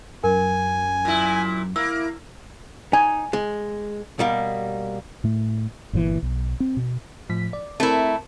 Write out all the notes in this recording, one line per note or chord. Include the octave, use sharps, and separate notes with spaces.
F#2 A#4 G#5
A#2 E4
A#3 E4 E6
D#4 G#5
G#3
B2 G3 A#3
A2 A3
G1 A#2 D3 E3
B1
C4
B2
A2 F3 B6
D5
A3 C4 E4 A#4